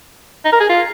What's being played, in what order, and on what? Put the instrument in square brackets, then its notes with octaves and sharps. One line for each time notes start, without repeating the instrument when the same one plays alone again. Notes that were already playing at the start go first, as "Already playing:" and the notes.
[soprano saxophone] D#4
A#4
G#4
F4